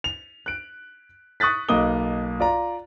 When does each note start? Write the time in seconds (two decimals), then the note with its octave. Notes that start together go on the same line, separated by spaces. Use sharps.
0.04 F7
0.46 F#6 D7
1.40 C#6 D#6 F#6 A6 B6
1.69 B1 A#3 D#5 D6 D#6 G7
2.40 F4 D5 A#5